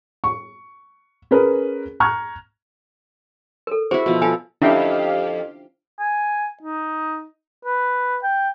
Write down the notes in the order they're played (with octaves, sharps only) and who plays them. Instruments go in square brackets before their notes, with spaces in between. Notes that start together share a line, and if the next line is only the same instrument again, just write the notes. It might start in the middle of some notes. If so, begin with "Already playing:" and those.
[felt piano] C#6
C#4 G#4 A#4 B4
A#5 C#6 F6 F#6 G#6
[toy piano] A4 A#4
[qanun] E4 F#4 [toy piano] G#4 C5
[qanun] B2 F3
[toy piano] F4 G#5 [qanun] A4 F5
[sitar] F2 [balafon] C#4 E5 [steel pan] D4 E4 G5 [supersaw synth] G4 F5
[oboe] G#5
D#4
B4
G5